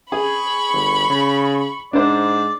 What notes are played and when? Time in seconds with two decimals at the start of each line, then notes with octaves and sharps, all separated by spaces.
0.12 G#4 B5 C#6
0.73 G1
1.09 C#3
1.93 G#2 D4 C5 D5